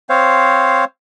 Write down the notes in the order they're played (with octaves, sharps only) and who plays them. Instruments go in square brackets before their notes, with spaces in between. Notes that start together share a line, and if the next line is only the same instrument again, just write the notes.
[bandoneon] C4 C5 C#5 F5